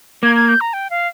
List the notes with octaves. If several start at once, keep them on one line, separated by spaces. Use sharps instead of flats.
A#3 G#6
G#6
G6
A#5
G5
F5